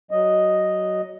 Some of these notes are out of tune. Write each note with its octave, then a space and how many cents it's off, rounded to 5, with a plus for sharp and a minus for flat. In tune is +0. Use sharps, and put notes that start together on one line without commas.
F#3 +15 D#5 +0